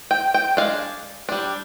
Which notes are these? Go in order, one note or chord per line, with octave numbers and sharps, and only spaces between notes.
G5
G5
G#3 D4 F5
G3 D4